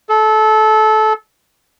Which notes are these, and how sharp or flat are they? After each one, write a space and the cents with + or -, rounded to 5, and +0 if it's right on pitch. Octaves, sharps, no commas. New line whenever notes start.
A4 -20